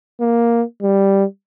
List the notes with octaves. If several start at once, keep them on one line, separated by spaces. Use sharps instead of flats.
A#3
G3